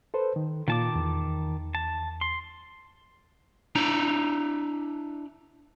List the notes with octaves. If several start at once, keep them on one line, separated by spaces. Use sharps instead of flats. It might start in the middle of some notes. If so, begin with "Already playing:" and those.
A4 B4 C5
D#3
A#2 D#3 F4 A5 D6
E2
A5
C6
D4 E4 A#5